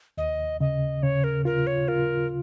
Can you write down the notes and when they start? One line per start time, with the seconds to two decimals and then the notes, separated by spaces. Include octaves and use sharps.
0.18 D#2 D#5
0.60 C#3 D#5
1.03 C#3 C#5
1.24 A#4
1.45 F4 A#4
1.67 C#5
1.88 F4 A#4